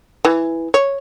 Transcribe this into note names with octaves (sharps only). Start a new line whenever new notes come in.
E3
C#5